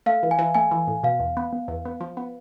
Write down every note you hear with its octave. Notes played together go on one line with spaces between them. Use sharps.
A3 F5
E3
G#5
E3
A3 G#5
E3
A2
B2 F5
E2
B3
B3
E2
B3
F3
B3